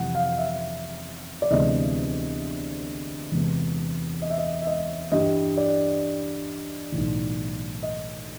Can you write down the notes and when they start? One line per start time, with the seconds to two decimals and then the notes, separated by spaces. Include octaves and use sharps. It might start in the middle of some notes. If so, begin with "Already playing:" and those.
Already playing: F2 C3 E3 G3 F#5
0.15 F5
0.38 E5
1.42 D5
1.50 D2 C3 E3 G#3 B3 D#5
3.32 E2 C3 E3 G#3 B3
4.22 D#5
4.30 E5
4.38 D#5
4.62 E5
4.67 D#5
5.12 G2 E3 G3 D#5
5.57 D5
6.92 B1 A2 E3
7.83 D#5